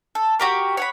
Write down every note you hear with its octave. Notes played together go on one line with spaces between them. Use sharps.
A4
F#4 G4 A#4
C#5 F#5 B5